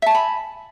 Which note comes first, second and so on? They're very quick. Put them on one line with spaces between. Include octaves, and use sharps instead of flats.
E5 A5 G#5 B5